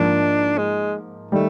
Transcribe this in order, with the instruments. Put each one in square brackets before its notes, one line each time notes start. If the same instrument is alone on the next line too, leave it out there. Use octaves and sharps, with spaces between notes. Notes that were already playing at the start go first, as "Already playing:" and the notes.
Already playing: [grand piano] G#2 F3 A#3 [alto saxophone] D4
[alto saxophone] G#3
[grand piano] D#3 G3 [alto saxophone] A3